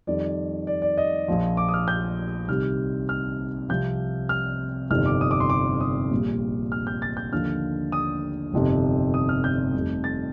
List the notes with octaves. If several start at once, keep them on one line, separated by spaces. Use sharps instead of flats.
F2 D#3 G3 D5
D5
D5
D#5
A#1 A#2 F3
D6
D#6
F6
G6
C2 C3 D#3 G3 F6
F6
C2 C3 F3 G6
F6
G1 F2 C3 D#3 F6
D6
D#6
D6
C6
D6
D#6
A#1 A#2 G3
F6
G6
A6
G6
D#2 D3 F3 F6
D#6
G1 F2 C3 D#3
D#6
F6
G6
F1 F2 C3 D#3 G3
A6